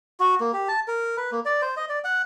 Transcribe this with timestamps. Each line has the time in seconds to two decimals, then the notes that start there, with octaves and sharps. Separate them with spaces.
0.20 F#4
0.40 A#3
0.53 G4
0.68 A5
0.88 A#4
1.17 B4
1.32 A#3
1.45 D5
1.62 C5
1.77 D#5
1.89 D5
2.04 F#5